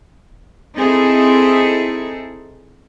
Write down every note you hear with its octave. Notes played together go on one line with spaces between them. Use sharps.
C4 D#4 E4 G#4 A4